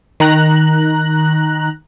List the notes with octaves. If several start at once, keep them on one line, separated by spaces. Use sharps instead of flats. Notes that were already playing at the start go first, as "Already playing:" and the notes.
D#3 A#5 F#6